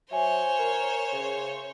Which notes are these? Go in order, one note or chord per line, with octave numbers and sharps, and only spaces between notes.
F#3 C5 C#5 E5 G#5
A#4
C#3